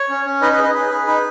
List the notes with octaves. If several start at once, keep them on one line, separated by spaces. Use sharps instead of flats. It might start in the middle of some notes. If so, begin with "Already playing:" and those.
Already playing: C#5
C#4
C#4
D#4 B4 D#5
B4 D#5
G#4
B4 D#5
G#4 B4
G#4
D#4 B4